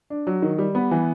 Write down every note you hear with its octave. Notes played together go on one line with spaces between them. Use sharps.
D4
F#3
D#3
G3
B3
E3